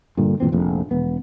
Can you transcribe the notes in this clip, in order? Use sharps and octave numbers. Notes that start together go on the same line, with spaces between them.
G2 A#2 D3
G#1 A#2 E3 C4
F1 A#1 F2
E1 B3